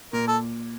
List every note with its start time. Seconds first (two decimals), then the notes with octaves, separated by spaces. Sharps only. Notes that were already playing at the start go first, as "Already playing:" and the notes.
0.13 A#2 A#4
0.28 A4